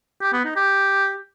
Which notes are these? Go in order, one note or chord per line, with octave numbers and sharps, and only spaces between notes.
G4
B3
D#4
G4